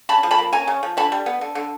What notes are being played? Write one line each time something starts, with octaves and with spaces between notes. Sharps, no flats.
C#3 A5 B5
F3
A5 B5
A#3
C#4 G#5 A#5
C#3
F3
D3 A5 B5
G3
B3
D3
D3